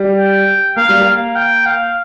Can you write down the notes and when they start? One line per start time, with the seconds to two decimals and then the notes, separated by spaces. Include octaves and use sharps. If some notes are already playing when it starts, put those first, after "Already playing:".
Already playing: G3
0.17 G5
0.76 A#3 F5
0.89 G3
1.00 A#3
1.06 F5
1.36 G5
1.66 F5